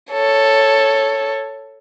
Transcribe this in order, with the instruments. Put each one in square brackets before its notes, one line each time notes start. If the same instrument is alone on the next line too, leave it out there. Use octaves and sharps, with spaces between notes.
[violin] A4 C#5